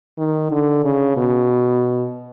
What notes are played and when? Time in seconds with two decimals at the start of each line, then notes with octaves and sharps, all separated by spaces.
0.18 D#3
0.51 D3
0.84 C#3
1.17 B2